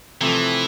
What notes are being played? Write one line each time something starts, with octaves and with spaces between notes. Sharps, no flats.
C3 E3 F3 A3 C4